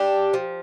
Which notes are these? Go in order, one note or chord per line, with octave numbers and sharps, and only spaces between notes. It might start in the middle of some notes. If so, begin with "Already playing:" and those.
Already playing: D4 G4
F3